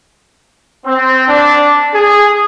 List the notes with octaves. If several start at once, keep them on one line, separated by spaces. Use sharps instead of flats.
C4
D4
G#4